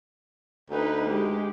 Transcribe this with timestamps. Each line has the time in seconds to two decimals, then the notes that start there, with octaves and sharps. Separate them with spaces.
0.70 D2 D#4 B4
1.08 G#3 G4